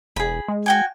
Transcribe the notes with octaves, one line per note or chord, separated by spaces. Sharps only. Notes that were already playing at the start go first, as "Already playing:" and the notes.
E1 G#4 B5
G#3
F#4 G5 G#5